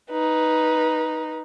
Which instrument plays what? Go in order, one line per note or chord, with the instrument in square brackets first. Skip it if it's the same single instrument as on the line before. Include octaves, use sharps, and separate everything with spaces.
[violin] D#4 B4